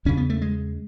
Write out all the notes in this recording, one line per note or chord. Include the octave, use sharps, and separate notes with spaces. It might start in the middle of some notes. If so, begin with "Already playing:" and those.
E2 C#3 C#4
B3
A3
G#3